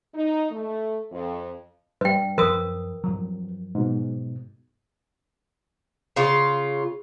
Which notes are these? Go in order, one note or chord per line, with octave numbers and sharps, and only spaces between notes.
D#4
A3
F2
G2 G3 B4 G5
F#2 F3 A#4 B4 D#6
G2 F3 F#3
G#2 B2
C#3 F4